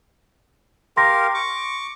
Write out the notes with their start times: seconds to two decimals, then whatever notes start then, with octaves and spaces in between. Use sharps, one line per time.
0.97 G4 A#4 F5 C6 A#6
1.34 C#6 D6